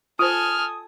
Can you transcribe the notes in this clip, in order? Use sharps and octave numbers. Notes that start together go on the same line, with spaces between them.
F4 A4 C5 G#5 D#6 F6